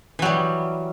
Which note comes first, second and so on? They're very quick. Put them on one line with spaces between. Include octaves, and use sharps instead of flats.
E3 F#3 G3